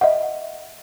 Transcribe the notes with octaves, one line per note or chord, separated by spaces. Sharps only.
D#5 E5 F#5